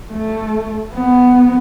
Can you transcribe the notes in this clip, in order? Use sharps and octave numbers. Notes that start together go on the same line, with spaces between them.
A3
B3